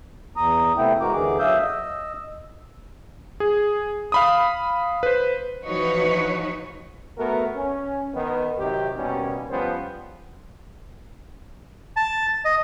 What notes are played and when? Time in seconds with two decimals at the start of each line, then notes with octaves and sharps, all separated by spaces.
0.36 E2 A#5 D#6
0.78 C3 A3 B3 E4 G5
1.01 G#3 F#4 A#4 D6
1.13 D#2 D3 E3 G#4 D6
1.39 F#3 E5 F5 D#6 E6 G6
1.62 D#5 E6
3.40 G#4
4.12 F5 B5 D#6
5.03 B4 C5
5.64 E3 F3 D#4 F#4 B4 C#5
7.17 A3 B3 F#4 A#4
7.55 C#4
8.14 D#3 B3
8.59 C3 D#3 F#3 G4
8.96 B2 D#3 G3 A#3 C#4
9.49 F3 G3 B3 C#4 C5
11.96 A5
12.45 D#5